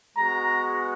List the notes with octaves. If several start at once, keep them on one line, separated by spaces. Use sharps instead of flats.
G#3 B3 F#4 A#5